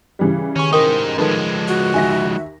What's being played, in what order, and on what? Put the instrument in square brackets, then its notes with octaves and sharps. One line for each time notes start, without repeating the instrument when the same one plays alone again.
[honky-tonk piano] C#3 E3 G3
[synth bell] D#3 C#6 [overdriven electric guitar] C#4
[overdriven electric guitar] D#4 C5 [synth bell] A#4 G5 D#6
[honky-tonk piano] D#3 A4 B4 [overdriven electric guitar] F3 G#3
[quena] F#4
[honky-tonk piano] D#2 E5 A#6 [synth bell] G#5